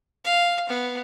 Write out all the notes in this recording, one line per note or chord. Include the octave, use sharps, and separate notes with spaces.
F5
B3